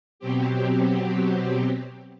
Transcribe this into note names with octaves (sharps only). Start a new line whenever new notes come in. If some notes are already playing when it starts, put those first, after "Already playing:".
B2 F#3 C4 G4